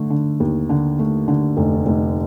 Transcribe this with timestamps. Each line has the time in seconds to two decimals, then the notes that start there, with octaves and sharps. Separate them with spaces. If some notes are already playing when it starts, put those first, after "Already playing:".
Already playing: D3 A3
0.10 D3
0.40 D#2
0.69 D3
0.99 A3
1.28 D3
1.57 F1
1.86 F1